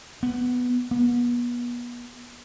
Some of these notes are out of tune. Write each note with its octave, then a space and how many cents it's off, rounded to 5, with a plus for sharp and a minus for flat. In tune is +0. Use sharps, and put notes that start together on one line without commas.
B3 +0
B3 -35